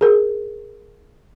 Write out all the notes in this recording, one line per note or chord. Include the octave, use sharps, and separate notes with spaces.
G#4 A#4